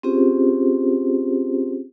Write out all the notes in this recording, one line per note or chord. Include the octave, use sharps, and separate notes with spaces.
C4 C#4 F4 G4 G#4 C5